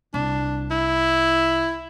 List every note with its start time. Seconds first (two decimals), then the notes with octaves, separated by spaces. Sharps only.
0.14 C2 D4
0.71 E4